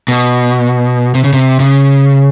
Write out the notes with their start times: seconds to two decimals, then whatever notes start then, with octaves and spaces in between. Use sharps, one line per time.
0.08 B2
1.15 C3
1.24 C#3
1.33 C3
1.60 C#3